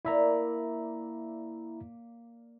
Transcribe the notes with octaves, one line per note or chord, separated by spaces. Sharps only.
A#3 E4 D5 E5 A#5